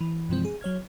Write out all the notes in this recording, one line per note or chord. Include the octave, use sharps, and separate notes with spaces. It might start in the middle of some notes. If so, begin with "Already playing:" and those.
E3
G2 C3 E3 F3 G#3 C4
G#4
F#3 C#5 F6 G#6